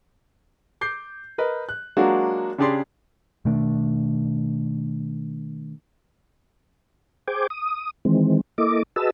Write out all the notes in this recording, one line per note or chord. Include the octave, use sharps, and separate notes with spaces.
D6 G6 C7
A#4 B4 D#5
F#6
F#3 G#3 A#3 D4 F4 F#4
C#3 D4 G4 G#4 D5 C6
B2 D#3 A3 D4
G#4 C5 G5 G#5 D6
D#6
D#3 E3 G#3 C4
A#3 E4 A4 D#5 D6
F#4 G#4 B4 D#5 A5 E6